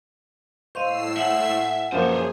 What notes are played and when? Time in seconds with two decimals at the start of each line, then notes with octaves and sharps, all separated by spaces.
0.75 A2 C5 D#5 F5 C#6 E6 C7
1.17 E5 F#5 G#5
1.92 F#2 F3 A#3 G#4 C5 C#5